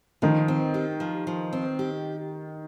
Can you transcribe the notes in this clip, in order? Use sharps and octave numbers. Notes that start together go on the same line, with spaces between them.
D#3 F3
C4
G4
F3
F3
C4
G4